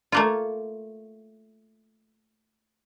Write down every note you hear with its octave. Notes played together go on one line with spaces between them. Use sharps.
A3 A#3 F4